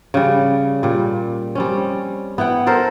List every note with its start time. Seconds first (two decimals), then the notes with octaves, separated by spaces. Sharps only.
0.14 C#3 G3
0.83 A#2 G3
1.55 G3 C4 C#4
2.38 B3 E4 F#5 G5
2.67 A4 A#4 C5